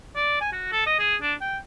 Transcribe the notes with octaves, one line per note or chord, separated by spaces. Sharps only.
D5
G#5
F#4
A4
D#5
G#4
D4
G5